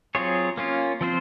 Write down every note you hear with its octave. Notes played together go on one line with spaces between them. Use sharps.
F#3 C4 F4 G#4 C#5
A#3 C#4 F4
F3 C4 F4 C5